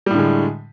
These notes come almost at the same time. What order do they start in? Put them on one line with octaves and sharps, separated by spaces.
G3 A2 D3 G#3